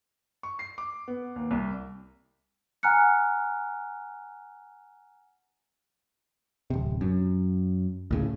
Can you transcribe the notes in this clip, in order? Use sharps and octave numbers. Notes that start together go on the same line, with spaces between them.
C#6
C7
D6
B3
D#2
C2
F#5 G#5 A#5 F6 F#6 C#7
D1 C3
F#2
D2 A2 C#3